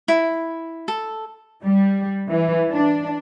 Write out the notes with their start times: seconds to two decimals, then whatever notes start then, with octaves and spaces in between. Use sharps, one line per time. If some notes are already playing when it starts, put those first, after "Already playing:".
0.08 E4
0.88 A4
1.63 G3
2.29 E3
2.71 D4